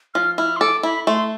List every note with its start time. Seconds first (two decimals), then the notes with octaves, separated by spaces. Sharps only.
0.14 F3 F6
0.38 E4 F6
0.56 C6
0.61 A4 D6
0.83 E4 B5
1.07 A3 C6